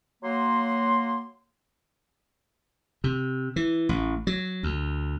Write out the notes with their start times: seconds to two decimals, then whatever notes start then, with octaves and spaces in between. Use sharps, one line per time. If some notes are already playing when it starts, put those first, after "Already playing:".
0.23 F#3 A#3 C6
3.04 C3
3.56 E3
3.89 A1
4.27 F#3
4.63 D2